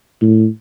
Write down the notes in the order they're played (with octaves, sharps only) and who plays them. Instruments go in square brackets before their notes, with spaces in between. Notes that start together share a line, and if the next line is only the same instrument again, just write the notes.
[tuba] A2